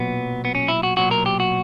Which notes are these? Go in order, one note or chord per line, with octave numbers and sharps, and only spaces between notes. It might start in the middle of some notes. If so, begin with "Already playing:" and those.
Already playing: B1 A#2 F#3 B3
B3
C#4
E4
F#4
B1 A#2 F#3 F#4
A#4
G4
F#4